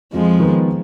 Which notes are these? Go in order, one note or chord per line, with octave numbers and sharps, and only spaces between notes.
F2 F3 G#3
D#3 B3